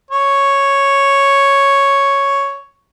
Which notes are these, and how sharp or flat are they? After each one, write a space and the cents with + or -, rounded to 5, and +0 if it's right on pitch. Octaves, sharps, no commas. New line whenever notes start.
C#5 +0